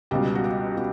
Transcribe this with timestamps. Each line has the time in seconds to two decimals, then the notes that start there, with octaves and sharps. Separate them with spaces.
0.11 C#2 B2 G3 G4
0.35 F#4
0.44 G4
0.77 B2 F#4